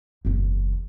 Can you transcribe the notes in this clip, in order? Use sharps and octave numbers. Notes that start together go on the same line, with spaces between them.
F#1 E2